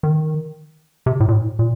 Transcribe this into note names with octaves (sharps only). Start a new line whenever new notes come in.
D#3
C3
A2
A#2
A2
A#2